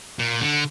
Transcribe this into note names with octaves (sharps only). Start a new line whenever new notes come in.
A#2
D3